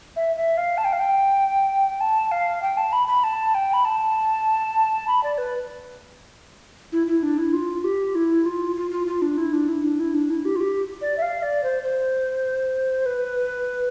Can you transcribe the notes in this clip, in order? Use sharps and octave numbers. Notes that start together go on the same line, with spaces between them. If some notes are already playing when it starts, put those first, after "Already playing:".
E5
E5
F5
A5
G5
F5
G5
A5
F5
G5
A5
B5
B5
A5
G5
B5
A5
B5
D5
B4
E4
E4
D4
E4
F4
G4
E4
F4
F4
F4
F4
D4
E4
D4
E4
D4
E4
D4
E4
G4
F4
G4
D5
E5
F5
D5
C5
C5
B4